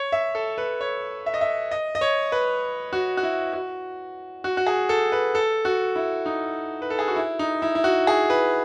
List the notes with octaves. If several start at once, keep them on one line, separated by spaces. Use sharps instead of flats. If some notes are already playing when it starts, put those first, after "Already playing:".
Already playing: C#5
E5
A4
B4
C#5
E5
D#5
E5
D#5
D#5
C#5
B4
F#4
F#4
E4
F#4
F#4
F#4
G#4
A4
B4
A4
F#4
E4
D#4
B4
A4
G#4
F#4
E4
D#4
E4
E4
F#4
G#4
B4